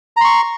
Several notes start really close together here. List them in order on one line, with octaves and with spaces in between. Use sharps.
A#5 C6 C#6